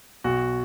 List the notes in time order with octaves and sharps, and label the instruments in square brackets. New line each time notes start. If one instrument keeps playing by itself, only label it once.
[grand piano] B1 F#4